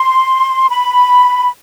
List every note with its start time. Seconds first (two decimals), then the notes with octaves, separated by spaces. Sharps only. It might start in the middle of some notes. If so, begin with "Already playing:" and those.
Already playing: C6
0.69 B5